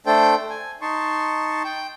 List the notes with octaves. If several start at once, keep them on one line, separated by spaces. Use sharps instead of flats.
A3 D4 A4 C5 G5
G#5
D#4 A5 C6 C#6
G5